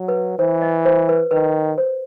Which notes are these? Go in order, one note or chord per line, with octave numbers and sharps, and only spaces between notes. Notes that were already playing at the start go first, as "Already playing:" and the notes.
Already playing: F#3
B4
E3 C5
D#5
C5
B4
D#3 B4
C5